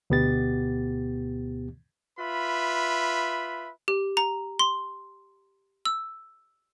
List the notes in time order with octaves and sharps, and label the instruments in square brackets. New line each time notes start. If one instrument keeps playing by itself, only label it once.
[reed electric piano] D2 B2 B3 G4 A6
[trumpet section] F4 B4 E5 B5
[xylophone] G4
A#5
C6
E6